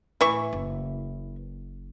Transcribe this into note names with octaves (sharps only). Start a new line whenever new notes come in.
A2 E3 E4 C#6
F#1